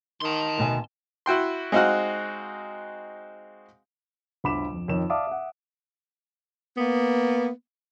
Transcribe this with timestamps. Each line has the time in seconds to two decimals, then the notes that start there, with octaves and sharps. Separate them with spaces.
0.22 D#3 A5 C6
0.57 D2 B2 G#5
1.26 E4 F#4 G5 C6
1.72 G#3 C4 D#4 F#4 F5 F#5
4.44 G1 D2 B5 D6 E7
4.72 F2
4.88 F2 D#3 C#5 E7
5.10 D5 E5 F5 A5 D6 D#6
5.27 E5 F#5
6.77 A#3 B3